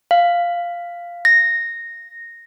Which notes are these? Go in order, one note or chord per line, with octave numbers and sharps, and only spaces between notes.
F5
A#6